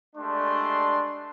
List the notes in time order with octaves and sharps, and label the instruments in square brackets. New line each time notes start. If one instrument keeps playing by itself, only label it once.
[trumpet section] G#3 A3 D4 G4 D5 C6